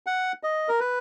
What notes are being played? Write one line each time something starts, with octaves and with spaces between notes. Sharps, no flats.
F#5
D#5
A#4
B4